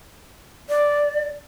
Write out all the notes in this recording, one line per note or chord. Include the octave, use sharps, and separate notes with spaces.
D5